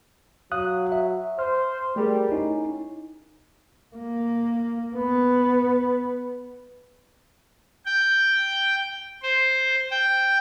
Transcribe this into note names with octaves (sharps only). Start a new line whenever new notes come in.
F#3 F5 D#6 F#6
E5
C5 F6
G3 A3 G#4 A#4
C#4 D#4 E4
A#3
B3
G5
C5
G5